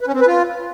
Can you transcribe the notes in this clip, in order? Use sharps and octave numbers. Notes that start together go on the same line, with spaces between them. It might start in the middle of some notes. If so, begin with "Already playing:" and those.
B4
C#4
C4
B4
F4